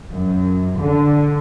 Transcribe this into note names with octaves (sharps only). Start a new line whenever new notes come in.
F#2
D3